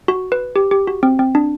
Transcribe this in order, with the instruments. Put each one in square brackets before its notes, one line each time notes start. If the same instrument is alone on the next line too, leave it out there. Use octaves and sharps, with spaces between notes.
[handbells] F#4
B4
G4
G4
F#4
C4
C4
D4